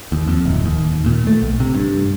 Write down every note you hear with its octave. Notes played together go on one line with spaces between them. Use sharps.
D#2
F2
D1
D#2
A#2
A3
B1
C3
G2